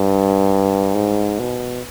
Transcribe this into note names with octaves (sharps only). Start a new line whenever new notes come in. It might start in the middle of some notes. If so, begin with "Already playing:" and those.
Already playing: G2
G#2
B2